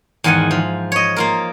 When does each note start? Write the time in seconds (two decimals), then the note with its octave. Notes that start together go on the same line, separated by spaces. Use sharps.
0.24 E2 G#2 D#3 F#5 G#5
0.51 F3
0.92 C#5 D#5
1.16 A#3 F4 A#4